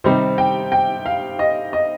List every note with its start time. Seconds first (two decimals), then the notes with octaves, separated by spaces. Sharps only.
0.04 C3 D#3 G3 C4 D#4 C5
0.38 G5
0.72 G5
1.06 F5
1.39 D#5
1.73 D#5